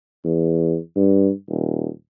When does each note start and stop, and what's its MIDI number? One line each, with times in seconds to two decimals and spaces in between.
0.24 0.77 40
0.96 1.31 43
1.49 1.88 27